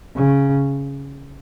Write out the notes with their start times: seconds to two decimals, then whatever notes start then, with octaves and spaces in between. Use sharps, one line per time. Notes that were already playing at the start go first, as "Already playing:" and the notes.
0.16 C#3